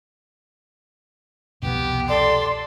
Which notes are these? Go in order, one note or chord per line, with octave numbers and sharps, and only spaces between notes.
C2 F2 B2 B3 G4
A4 D5 C6